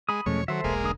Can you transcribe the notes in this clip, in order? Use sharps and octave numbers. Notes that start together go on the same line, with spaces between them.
G#3 B5 D#6
E2 B2 F3 G#3 A3 C#4 C#5
D#3 F#3 A4 C5 E5
E1 B1 G#3 A#3
D3 D#6